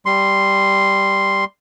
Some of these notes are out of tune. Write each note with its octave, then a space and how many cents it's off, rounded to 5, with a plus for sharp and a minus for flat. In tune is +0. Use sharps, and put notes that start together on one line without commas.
G3 +0 C6 +0